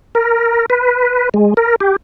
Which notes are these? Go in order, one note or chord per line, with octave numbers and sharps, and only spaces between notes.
A#4
B4
G#3
A#4
G4